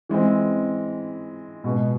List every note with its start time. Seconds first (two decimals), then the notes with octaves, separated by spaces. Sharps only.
0.09 E3 G#3 C4
1.64 B2 G#3 B3